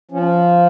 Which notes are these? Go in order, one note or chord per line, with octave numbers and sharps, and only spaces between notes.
F3 C#4